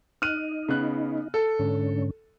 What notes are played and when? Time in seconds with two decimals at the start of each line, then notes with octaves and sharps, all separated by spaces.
0.22 D#4 F6 F#6 D#7
0.69 C#3 B3 F#6
1.34 A4
1.59 G#2 D3 C#4